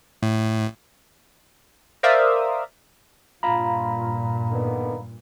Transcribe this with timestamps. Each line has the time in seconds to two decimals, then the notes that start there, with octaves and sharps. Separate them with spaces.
0.23 A2
2.03 A#4 C5 D5 E5 F5 D#6
3.43 G2 A#2 F4 F5 A#5 B5
4.52 D3 D#3 B3